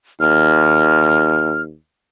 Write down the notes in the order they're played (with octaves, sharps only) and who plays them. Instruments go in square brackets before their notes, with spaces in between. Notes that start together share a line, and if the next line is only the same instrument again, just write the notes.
[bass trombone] D#2 [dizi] F6